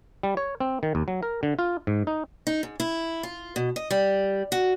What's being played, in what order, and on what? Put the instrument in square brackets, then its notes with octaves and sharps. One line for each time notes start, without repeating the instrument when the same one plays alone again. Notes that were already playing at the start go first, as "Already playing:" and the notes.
[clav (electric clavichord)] G3
C#5
C4
D#3
D#2
F#3
A#4
D3
F4
G#2
D#4
[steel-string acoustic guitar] D#4
G#2
E4
F4
B2
D#5
G3
F#4